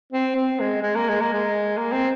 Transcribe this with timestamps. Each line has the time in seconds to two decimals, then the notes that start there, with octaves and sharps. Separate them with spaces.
0.12 C4
0.36 C4
0.60 G#3
0.82 G#3
0.95 A#3
1.09 G#3
1.21 A#3
1.33 G#3
1.77 A#3
1.92 C4